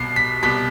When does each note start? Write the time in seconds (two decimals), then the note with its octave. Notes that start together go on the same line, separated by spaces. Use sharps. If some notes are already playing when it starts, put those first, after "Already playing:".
Already playing: C2 B2 C7
0.16 B6
0.43 C2 B2 B6